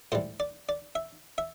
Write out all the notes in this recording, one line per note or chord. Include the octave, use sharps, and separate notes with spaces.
A2 E3 G3 C5
D5
D5
E5
E5